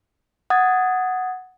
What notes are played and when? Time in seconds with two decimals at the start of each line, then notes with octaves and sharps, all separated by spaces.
0.50 F#5 D#6 G#6 A6